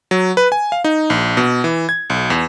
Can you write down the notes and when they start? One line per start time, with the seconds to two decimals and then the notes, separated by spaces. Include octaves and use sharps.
0.11 F#3
0.37 B4
0.52 G#5
0.72 F5
0.84 D#4
1.10 A#1
1.37 B2
1.64 E3
1.89 G#6
2.10 B1
2.30 E2